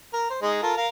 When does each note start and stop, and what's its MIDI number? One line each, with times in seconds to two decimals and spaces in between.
0.13 0.26 70
0.30 0.39 72
0.42 0.61 56
0.42 0.61 63
0.63 0.74 65
0.63 0.74 69
0.63 0.74 70
0.77 0.88 70
0.77 0.88 77